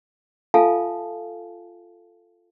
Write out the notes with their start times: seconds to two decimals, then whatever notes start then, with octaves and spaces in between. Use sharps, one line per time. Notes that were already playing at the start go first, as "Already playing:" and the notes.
0.54 F4 A4 E5 F5 G#5 A5